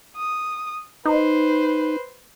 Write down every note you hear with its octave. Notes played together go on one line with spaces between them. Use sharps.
D#6
D#4 B4 C5